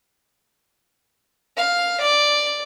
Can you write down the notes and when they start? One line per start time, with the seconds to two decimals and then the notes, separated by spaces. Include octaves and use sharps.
1.57 F5
2.01 D5